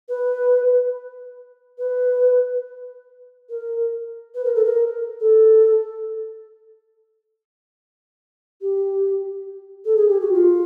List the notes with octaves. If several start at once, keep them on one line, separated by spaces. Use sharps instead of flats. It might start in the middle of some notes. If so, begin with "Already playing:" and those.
B4
B4
A#4
B4
A#4
A4
A#4
A4
G4
A4
G#4
G4
F#4
F4